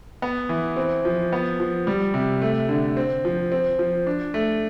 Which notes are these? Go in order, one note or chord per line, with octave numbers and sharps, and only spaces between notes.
B3
E3
C4
F3
B3
F3
G3
C3
A3
D3
C4
F3
C4
F3
D4
A3